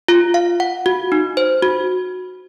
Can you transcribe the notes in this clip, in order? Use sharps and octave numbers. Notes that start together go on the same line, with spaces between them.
F4
F5
F#5
F#4
D#4
C5
F#4